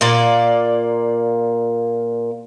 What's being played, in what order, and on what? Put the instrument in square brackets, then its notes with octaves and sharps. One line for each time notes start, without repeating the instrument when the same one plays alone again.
[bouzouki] A#2 A#3 D5